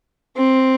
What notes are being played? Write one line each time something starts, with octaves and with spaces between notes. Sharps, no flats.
C4